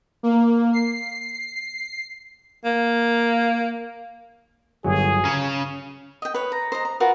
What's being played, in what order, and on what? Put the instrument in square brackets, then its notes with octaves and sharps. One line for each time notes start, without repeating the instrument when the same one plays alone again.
[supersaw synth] A#3
C7
[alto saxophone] A#3
[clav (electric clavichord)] G1 F#3 [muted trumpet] G#4
[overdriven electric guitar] C#3 C#4 [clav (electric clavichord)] A#5
[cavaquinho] D#5 G5
B4 C#5
A#5
C5 D#5 A#5
A#5
F4 F#4 A#4 B4